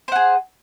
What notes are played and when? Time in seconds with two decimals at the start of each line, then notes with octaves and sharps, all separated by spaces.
0.08 C5
0.12 F#5
0.16 G#4